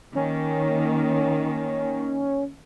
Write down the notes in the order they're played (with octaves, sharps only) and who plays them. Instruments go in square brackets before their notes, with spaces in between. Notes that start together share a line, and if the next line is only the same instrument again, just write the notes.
[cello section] D#3 A#3 [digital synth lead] C#4